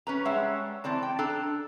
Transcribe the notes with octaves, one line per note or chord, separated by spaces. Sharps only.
C#4 B4 A#5
G3 G#3 C#5 E5 F#5
E3 C4 D5 A5
G5
D4 A4 G5 A#5